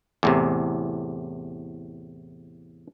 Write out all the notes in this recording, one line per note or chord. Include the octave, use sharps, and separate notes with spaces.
E2 A2 C3